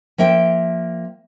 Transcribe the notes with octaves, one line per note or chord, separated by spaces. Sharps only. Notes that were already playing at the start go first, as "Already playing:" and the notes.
F3 A#3 E5 G5